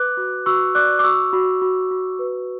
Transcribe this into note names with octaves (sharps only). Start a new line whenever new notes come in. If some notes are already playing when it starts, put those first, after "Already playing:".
Already playing: B4 D6 F#6
F#4
F#4 C#6 E6
D5 D6 F#6
D6
F#4 C#6 E6
F#4
F#4
F#4
B4